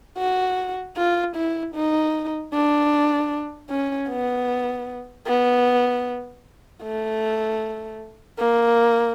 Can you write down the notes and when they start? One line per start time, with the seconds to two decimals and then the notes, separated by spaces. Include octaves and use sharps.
0.18 F#4
0.97 F4
1.36 E4
1.75 D#4
2.53 D4
3.70 C#4
4.09 B3
5.27 B3
6.83 A3
8.39 A#3